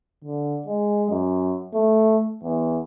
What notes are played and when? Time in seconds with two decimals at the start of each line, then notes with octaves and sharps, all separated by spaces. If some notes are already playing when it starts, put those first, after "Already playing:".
0.24 D3
0.67 G#3
1.10 F#2
1.73 A3
2.44 E2